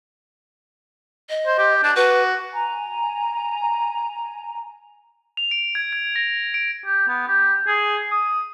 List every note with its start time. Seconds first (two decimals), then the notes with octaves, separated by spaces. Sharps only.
1.29 D#5
1.47 C5
1.59 G4
1.84 D4 A5
1.96 F#4 B4
2.52 G#5 A#5
5.37 F7
5.51 D7
5.75 G#6
5.93 G#6
6.16 A#6
6.54 D7
6.86 G4
7.08 B3
7.28 G4
7.67 G#4
8.11 D#6